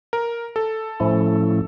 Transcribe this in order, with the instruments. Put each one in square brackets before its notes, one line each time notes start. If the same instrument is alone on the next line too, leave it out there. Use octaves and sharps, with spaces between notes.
[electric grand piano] A#4
A4
[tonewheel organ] A2 F3 A3 C#4 E4